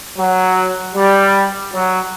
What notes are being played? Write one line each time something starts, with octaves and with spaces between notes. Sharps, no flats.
F#3
G3
F#3